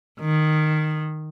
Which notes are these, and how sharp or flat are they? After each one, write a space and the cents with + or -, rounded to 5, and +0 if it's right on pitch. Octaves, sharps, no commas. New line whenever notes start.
D#3 -10